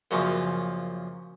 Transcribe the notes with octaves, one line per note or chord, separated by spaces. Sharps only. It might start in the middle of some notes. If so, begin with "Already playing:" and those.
F#2 A#2 C#3 F3